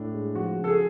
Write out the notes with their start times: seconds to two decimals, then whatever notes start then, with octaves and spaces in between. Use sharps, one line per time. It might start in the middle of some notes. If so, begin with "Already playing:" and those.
Already playing: A2 D4
0.14 G#3
0.35 F3 F#4
0.58 C#3
0.64 A4
0.68 G#4